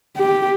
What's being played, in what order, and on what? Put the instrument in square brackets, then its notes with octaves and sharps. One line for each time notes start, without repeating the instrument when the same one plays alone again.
[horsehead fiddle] G4